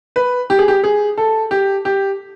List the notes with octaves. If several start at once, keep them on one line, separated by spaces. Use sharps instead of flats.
B4
G4
G#4
G4
G#4
A4
G4
G4